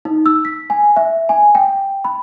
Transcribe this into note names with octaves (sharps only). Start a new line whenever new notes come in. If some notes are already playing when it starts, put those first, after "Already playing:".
D#4
E6
B6
G#5
E5
G#5
G5
B5